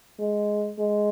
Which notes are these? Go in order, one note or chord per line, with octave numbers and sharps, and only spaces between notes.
G#3
G#3